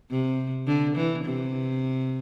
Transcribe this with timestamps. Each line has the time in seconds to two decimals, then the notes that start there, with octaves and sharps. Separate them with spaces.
0.11 C3
0.67 D3
0.96 E3
1.24 C3